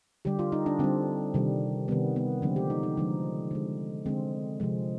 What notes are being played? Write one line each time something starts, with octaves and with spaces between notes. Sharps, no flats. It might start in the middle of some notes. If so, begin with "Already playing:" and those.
D3 G3 G4
F4
D#4
D4
D3 G3 C4
C3 D#3 G3
C3 D#3 G3 B3
B3
D3 F3 G#3 C4
G4
D#4
D#4
D3 F3 G#3 D#4
D3 G#3
D3 G#3 C4
C3 F3 G#3